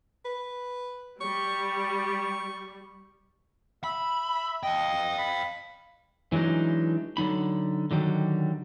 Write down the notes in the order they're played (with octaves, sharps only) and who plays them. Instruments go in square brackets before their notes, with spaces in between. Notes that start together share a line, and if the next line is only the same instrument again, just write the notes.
[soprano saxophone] B4
[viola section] G3 [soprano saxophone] C#6
[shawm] E5 [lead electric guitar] B5
[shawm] D#5 [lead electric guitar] F5 G5
[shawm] B5
[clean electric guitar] E3 F#3 G#3 D4 D#4
D3 F#3 D#4 B5
D3 D#3 F#3 G3